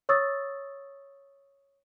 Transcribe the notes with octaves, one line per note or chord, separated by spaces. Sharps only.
C#5 C#6 D#6 E6 A6